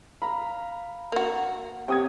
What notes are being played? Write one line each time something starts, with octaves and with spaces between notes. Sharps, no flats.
F5 A#5 B5
A#3 F#4
C3 C#5 G5 D#6 G#6